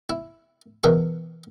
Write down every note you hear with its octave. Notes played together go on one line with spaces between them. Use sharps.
E4
E2 B2 A#4 E5 C#6